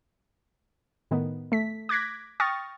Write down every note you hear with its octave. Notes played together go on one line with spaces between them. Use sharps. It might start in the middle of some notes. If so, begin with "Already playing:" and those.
A2 D#3 B3
A3 B6
D6 F#6 G#6 A#6 B6
G5 C#6 D#6 F6 A6 A#6